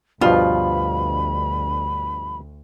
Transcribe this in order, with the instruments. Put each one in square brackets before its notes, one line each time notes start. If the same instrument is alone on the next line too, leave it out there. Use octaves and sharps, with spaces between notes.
[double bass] D2 [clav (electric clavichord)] G2 B2 F3 [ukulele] F4 [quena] B5